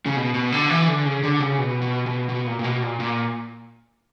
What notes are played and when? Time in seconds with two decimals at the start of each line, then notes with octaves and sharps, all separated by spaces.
0.06 C#3
0.16 B2
0.34 B2
0.52 D3
0.70 E3
0.88 D3
1.05 C#3
1.23 D3
1.40 C#3
1.58 B2
1.82 B2
2.06 B2
2.29 B2
2.47 A#2
2.59 A#2
2.64 B2
2.82 A#2
3.00 A#2